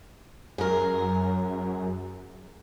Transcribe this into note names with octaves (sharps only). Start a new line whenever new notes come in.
F#2 G#4 A#4